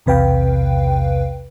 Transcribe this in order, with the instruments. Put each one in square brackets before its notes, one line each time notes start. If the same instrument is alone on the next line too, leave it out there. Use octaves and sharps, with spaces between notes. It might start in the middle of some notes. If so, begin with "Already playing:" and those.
[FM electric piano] B1 E2 C3 B4 F5 G5